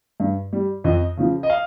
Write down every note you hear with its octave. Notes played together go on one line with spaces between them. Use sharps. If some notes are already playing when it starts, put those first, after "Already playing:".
G2
G3
F2 D#5
C#3 F3
D#5
F5